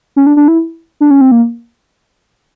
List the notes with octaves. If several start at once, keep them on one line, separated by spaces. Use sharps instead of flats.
C#4
D4
D4
E4
D4
C#4
C4
A#3